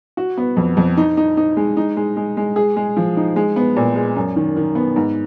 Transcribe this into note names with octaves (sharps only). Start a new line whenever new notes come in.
F#4
B3
F2
F2
D#4
D#4
D#4
G#3
D#4
G#3
G#3
G#3
G#4
G#3
F3
D#4
G#3
B3
A#2
G#3
F#2
D#3
D#3
B3
G#2